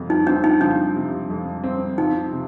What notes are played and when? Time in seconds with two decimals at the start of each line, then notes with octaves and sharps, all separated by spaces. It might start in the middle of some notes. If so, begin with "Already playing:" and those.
Already playing: F2 C3
0.10 D#4
0.26 C4 D4
0.44 D#4
0.61 F3 D4
0.95 C3
1.30 F2
1.64 C4
1.98 F3 D#4
2.32 C3